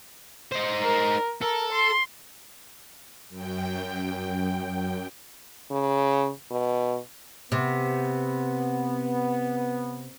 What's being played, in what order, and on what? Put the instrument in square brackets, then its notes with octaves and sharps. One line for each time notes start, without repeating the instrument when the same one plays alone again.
[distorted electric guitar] D#4 C5
[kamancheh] A#4
[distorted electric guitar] A4 [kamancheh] A#4
[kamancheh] C6
[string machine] F#2 G5
[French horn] C#3
B2
[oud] C3 [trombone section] B3